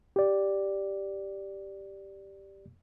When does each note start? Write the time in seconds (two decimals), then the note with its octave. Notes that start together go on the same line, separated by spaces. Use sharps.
0.16 G4 D5